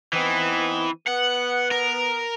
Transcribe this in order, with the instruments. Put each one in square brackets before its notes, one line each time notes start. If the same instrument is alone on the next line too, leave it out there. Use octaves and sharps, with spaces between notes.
[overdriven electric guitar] E3 [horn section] B3 C4 D#4
[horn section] B3 [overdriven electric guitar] F#5
[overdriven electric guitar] A#4